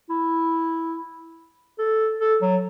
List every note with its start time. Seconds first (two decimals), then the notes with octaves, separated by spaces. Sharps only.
0.10 E4
1.79 A4
2.20 A4
2.41 F#3